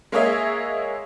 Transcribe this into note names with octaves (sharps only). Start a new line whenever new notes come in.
G#3 A#3 G#4 C#5 D#5 E5